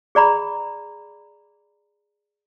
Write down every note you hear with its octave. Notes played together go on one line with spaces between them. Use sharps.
G#4 D5 A#5 B5